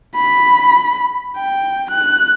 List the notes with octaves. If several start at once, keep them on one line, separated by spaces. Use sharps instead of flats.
B5
G5
F#6